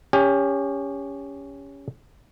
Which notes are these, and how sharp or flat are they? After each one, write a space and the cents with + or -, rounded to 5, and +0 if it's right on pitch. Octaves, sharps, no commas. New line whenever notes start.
C#4 +15 G4 +30